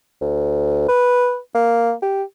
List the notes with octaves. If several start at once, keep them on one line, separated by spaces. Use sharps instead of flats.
D2
B4
A#3
G4